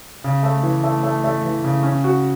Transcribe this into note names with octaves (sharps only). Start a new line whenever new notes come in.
C#3
A3
E3
A3
A3
A3
E3
C#3
C#4
F#4